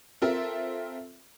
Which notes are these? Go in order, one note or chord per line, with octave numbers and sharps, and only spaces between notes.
C4 F4 A4 A#4 E5